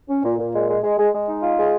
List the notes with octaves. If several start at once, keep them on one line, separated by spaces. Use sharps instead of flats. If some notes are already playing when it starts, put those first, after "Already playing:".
C#4
A#2
A#2
G#3
G#3
G#3
G#3
G#3
D#4
F4
G#3